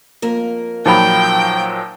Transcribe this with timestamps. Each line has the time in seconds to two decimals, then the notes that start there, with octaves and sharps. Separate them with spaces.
0.22 F2 A#3 A#4
0.86 A#2 F3 F#3 D#4 G5 B5